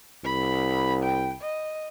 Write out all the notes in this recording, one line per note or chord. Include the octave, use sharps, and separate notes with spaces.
C2 B5
G5
D#5